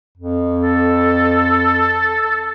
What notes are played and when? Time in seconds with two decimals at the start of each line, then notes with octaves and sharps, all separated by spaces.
0.17 F2
0.63 A4